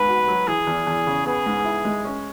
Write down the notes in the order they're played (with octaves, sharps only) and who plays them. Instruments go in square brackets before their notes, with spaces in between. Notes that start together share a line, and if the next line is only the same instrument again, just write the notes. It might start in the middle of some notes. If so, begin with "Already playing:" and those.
Already playing: [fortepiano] G#2 B3 [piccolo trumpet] B4
[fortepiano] F#4
F#3
[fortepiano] E3 [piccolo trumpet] G#4
[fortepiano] E2
E2
C#3
[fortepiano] B3 [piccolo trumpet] G#4
[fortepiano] G#2
E4
G#3
C#4